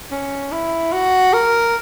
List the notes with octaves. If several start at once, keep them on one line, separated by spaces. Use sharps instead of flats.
C#4
E4
F#4
A#4